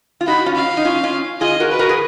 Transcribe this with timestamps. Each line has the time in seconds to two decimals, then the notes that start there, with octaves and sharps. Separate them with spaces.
0.21 F4
0.27 D#4 F#4 B5
0.46 C#4 F4
0.55 F5
0.77 D#4
0.85 C#4 F4
1.03 C#4 F4
1.41 F4 G#4 D#5
1.60 F#4 A#4
1.70 B4
1.79 F#4 A#4
1.89 G#4